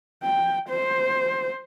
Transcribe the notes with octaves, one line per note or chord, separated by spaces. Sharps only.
G5
C5